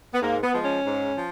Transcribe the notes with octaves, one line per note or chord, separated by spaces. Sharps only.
B3
G#2 A#3
B3
F3 G#3
C#4
G#2
F3